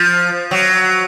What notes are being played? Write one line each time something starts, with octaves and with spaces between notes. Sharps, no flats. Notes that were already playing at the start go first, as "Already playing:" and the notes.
Already playing: F3
F#3